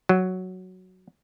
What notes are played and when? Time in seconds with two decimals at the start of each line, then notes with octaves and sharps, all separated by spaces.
0.09 F#3